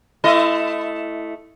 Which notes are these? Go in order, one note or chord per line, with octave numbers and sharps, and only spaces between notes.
A3 E4 D#5